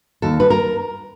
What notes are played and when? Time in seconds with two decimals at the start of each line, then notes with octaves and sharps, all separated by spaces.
0.22 D#2 A4
0.40 B4
0.50 A#4